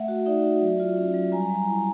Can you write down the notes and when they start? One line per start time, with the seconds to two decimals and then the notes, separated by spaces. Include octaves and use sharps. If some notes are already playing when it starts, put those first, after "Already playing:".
Already playing: A3 E5 F#5
0.08 F#4
0.26 D#4 D5 E5
0.44 F#4
0.61 F#3
0.80 F4
0.97 C#4
1.14 F#3
1.32 G3 G#5 A#5
1.49 G3
1.55 G#5 A#5
1.68 E4